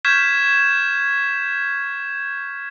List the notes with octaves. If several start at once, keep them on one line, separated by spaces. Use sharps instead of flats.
C#6 F6 G6 G#6 B6 E7